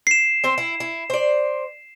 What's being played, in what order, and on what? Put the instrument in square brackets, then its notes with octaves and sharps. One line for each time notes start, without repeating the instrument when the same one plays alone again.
[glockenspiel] C7 E7
[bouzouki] C4 C5
E4
E4
C5 D5